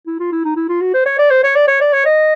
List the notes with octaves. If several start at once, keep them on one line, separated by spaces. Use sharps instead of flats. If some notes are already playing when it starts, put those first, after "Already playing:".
E4
F4
E4
D#4
E4
F4
F#4
C5
C#5
D5
C5
C#5
D5
C#5
D5
C#5
D#5